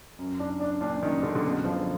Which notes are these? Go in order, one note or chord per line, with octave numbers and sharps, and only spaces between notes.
F#2
D4
D4
A#2 D4
F#2 D#3
F#2 D3
D3
F#2 B2
D3 F3